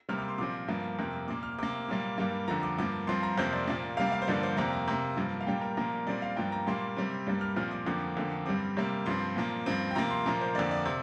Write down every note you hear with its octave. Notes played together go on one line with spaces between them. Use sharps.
C3 G3 A#3 F6
D6
C6
A#2 F3 C4 D6
G2 F3 A#3
F2 C3 A#3
A#2 A#3 D6
F6
C3 A#3 D6
A#2 G3 A#3
G2 G3 A#3
F2 D3 F3 A#5
D6
G2 F3 A#3 D6
G2 F3 C4 C6
A#5
F2 C3 F3 A#3 C5
D5
A#2 F3 A#3
C3 G3 A#3 F5
F5
C5
G2 D3 F3 A#3 D5
C5
F2 C3 A#3 A#5
A#5
C3 A#3
G2 F3 A#3
F5
A#2 G3 A#3 G5
A#4
A#2 F3 A#3 A#4
A#2 G3 C4 D5
F5
G2 F3 A#3 G5
A#5
A#2 G3 A#3 C6
C3 G3 C4
G2 G3 A#3
F6
A#2 F3 C4 F6
D6
F2 D3 F3 A#3 D6
F2 D3 A#3
G2 G3 C4 D6
C3 G3 A#3
G2 F3 C4 C6
A#2 F3 A#3
G2 F3 C4
G5
C3 F3 A#3 A#5
C6
A#2 F3 A#3 A#4
C5
F2 D3 A#3 D5
D5
C3